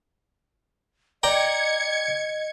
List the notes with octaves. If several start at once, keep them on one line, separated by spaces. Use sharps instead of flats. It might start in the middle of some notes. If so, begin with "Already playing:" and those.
D5 D#5 G5 A#5 G#6 C#7